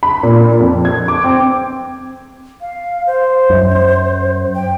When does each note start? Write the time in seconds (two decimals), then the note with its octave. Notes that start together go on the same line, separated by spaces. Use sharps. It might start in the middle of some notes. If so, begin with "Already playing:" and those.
0.03 B5
0.23 A#2
0.60 F2
0.85 G#6
1.08 D6
1.24 C4
2.61 F5
3.07 C5
3.50 F#2
4.55 G5